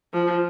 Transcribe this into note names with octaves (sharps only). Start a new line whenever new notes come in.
F3